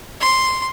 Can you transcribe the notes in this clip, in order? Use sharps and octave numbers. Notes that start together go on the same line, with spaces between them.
C6